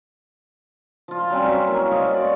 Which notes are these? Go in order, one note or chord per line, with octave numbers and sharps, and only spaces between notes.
F3 F4
F#3 G3 C4 C#4
B4 C#5 E5
A#3 E4
C5 C#5 D#5 F5
F#4 D5